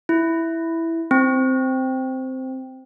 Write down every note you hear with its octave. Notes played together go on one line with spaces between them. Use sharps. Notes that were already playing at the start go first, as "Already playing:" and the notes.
E4
C4